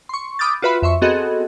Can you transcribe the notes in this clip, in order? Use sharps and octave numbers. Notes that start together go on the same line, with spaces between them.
C6 C#6
B5 D6 D#6 F6 G6 A6
F4 F#4 B4 E5 B5 C6
F2 E5 C6 C#6
B3 C4 F#4 G#4 A4 D#5